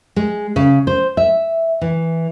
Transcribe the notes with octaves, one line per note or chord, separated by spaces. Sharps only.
G#3
C#3
C5
E5
E3